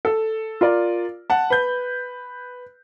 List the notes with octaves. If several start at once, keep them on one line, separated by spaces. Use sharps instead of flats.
A4
F4 A#4 D5
F#5 A5
B4 G6